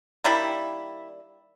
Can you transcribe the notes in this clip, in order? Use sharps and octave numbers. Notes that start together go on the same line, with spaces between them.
D#3 G3 A#3 D4 E4